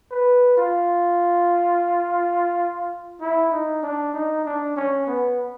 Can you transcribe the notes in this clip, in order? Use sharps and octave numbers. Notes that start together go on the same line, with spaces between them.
B4
F4
E4
D#4
D4
D#4
D4
C#4
B3